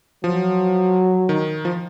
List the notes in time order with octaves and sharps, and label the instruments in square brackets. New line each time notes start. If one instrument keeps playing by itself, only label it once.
[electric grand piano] F3 [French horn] F#3
[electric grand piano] D#3
F3